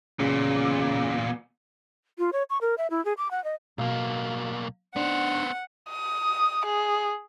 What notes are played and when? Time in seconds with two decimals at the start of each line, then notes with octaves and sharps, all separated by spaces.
0.19 E2 A#2 C#3
2.18 F4
2.33 C#5
2.50 C#6
2.61 A#4
2.78 E5
2.91 E4
3.05 G#4
3.18 D6
3.31 F#5
3.44 D#5
3.78 B1 B2 A#3 F5
4.96 B3 D4 D#4 C5 F#5
5.90 D#6
6.66 G#4